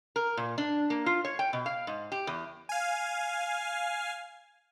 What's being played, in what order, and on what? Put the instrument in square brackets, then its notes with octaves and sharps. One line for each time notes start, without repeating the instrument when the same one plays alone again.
[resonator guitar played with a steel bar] A#4
A#2
D4
A#3
F4
C#5
G5
B2
F5
G#2
G4
E2
[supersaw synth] F5 G#5